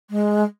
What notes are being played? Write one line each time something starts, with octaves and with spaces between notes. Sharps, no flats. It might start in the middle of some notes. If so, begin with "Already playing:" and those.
G#3